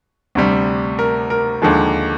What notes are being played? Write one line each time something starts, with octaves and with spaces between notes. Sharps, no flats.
D2 C3 G3
A#4
A#4
D#2 D3 F3 G#3